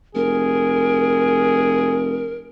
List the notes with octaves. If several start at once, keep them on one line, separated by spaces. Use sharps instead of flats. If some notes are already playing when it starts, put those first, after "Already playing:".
F1 G#4 A#4